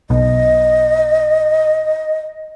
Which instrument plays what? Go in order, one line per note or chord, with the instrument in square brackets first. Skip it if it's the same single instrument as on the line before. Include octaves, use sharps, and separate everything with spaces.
[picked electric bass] B1 B2 [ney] D#5